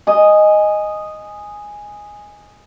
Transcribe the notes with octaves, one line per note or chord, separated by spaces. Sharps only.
D#5 G#5